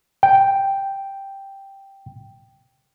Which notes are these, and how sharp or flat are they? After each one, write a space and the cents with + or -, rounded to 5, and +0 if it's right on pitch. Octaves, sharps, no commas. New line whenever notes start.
G5 +0